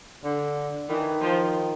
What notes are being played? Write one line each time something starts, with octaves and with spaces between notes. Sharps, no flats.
D3
D#3 E3
F3